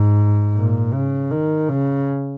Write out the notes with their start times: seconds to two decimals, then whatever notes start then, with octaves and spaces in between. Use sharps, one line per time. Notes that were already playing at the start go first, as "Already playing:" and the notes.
Already playing: G#2
0.55 A#2
0.93 C#3
1.31 D#3
1.69 C#3